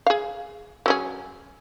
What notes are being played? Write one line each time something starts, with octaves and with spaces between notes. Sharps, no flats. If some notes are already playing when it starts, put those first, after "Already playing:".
G#4 F5
F#3 C#4 G#4